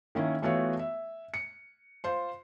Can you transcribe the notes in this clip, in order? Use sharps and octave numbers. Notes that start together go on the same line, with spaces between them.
D#3 A#3 C#4 E4
E3 A3 B3 F4 F#4 C#5
E5
C#7
F4 C5 C6